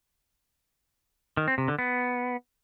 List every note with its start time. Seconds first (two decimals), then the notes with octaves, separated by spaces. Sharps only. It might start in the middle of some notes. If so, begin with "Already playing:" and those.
1.37 D#3
1.48 C4
1.58 C3
1.68 D3
1.79 B3